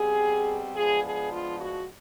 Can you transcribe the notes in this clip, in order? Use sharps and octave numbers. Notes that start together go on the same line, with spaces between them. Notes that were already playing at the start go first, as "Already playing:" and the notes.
Already playing: B2 G3 C4 G#4
F3 G#3 B3 D4 G#4
G#4
F4
F#4